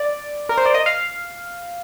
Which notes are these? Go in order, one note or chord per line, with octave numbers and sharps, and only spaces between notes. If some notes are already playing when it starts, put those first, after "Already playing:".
Already playing: D5
A#4
C5
D5
D#5
F5